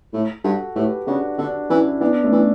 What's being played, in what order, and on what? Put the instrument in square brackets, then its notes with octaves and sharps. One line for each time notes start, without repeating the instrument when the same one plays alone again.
[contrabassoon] A2
[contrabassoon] G2 [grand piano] F#4 A4
[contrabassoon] A2 [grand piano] G4 B4
[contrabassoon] C#3 [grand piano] D4 F#4
[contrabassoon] D3 [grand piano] D4 F#4
[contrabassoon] E3 [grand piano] C#4 E4
[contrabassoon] E3 [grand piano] B3 D4
[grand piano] A3 C#4
[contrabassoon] E3